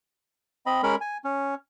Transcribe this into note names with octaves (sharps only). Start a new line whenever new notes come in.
C4 D#5 B5
G#3 C#4 A#4 B5
G#5
C#4